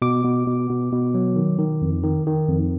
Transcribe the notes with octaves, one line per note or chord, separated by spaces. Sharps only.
B2 D6
B2
B2
B2
B2
F#3
D#3
D#3
F2
D#3
D#3
F2